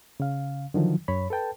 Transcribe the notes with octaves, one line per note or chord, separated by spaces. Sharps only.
C#3 F5
D3 D#3 F3 F#3
F#2 C#5 B5
A4 B4 G5 A5